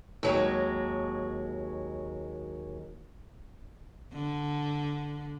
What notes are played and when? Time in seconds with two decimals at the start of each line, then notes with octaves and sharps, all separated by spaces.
0.23 D#2 F#3 G#3
4.13 D3